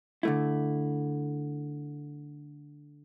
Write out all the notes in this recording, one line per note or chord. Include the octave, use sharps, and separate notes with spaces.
D3 A3 E4